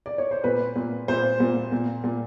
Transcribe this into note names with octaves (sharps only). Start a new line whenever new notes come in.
D5
C#5
C5
A#2 B4
A#2
A#2 C5
A#2
A#2
A#2